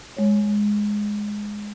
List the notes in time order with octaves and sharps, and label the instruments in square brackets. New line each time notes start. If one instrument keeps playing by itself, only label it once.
[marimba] G#3 C#5